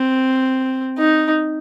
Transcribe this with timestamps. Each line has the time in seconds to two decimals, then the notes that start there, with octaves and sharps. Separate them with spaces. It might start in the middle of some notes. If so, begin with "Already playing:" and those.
Already playing: C4
0.98 D#4